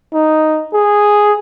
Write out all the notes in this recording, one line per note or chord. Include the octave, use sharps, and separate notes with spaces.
D#4
G#4